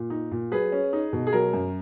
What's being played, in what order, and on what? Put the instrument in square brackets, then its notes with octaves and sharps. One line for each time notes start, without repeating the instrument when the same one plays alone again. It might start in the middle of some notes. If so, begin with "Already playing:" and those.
Already playing: [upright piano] A#2
D#4
A#2
F#3 G#4 B4
C#4
D#4
B2
G#4
F#3 A#4
F#2